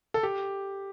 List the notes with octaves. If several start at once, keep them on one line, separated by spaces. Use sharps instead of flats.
A4
G4